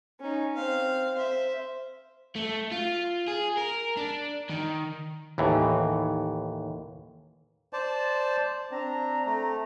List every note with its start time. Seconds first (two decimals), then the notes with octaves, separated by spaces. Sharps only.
0.20 C#4 D#4
0.55 C4 F5
1.14 C5 E5
2.36 A3
2.71 F4
3.28 G#4
3.57 A#4
3.97 D4
4.49 D#3
5.38 D#2 A2 E3
7.73 C5 D5 A5
8.71 C4 D4 A#5
9.26 A3